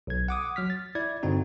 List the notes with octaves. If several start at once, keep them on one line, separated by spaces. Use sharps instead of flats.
B1 G#6
F#5 D6 D#6
F#3 F6 B6
A6
E4 D5 G#6
G2 D3 C4 D#4 F#4